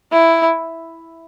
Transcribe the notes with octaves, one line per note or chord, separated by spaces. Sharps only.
E4